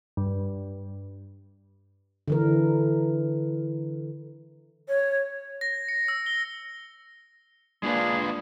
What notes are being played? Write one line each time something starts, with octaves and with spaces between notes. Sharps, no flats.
G2
D3 E3 A#4
C#5
A#6
C#7
E6
G7
G#3 A#3 D4 F4 G#4 B4